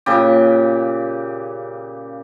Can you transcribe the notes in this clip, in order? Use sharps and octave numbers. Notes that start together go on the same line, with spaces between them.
A#2 C#3 G4